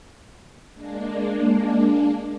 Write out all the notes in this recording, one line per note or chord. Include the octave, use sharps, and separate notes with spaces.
G#3 A#3 D4